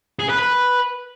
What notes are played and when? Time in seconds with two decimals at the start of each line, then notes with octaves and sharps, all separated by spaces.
0.19 G#4
0.29 B4
0.39 B4